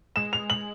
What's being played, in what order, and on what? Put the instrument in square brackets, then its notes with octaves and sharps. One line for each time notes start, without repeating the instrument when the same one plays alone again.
[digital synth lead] G#3 [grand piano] E7
[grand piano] F7
F#7